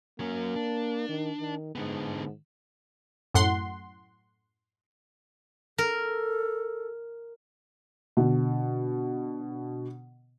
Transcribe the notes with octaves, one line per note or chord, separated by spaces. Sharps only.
F#3 A#3 C#4
D4
D#3
D#3
G#2 D3 B3
F#2 A2 F#5 C6
A4 A#4
B2 D3